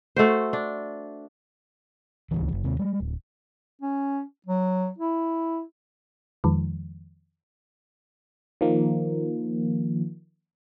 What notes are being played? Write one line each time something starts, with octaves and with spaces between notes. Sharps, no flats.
A3 F#4 C5
D4
D1 G1 C#2 E3
F#1
D#2 C3
G3 G#3
D1
C#4
F#3
E4
F2 D#3 F3 G#3
D#3 F3 A#3